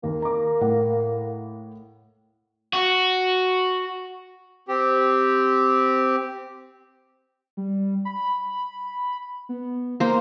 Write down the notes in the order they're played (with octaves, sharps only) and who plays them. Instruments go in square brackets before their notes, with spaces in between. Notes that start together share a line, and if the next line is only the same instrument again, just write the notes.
[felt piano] D#2 [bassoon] A#3
[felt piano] A#5 D6
A2 F#5
[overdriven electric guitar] F#4
[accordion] C4 G4
[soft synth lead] G3
B5
B3
[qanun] A#3 C5 [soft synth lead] A#5